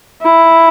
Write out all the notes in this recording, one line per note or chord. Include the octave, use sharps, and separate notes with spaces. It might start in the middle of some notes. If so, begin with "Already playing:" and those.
E4